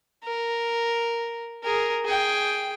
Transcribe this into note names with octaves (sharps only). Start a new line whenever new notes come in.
A#4
G#4 A#4
G#4 G5